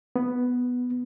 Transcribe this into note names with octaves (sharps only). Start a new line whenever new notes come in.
B3